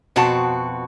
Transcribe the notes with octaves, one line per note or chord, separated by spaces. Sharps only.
F2 B2 C4 F#4 A5